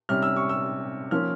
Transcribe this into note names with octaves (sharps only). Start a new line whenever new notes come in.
C3 G3 C#4 F6
E6
C#6
E6
F3 A#3 C#4 F6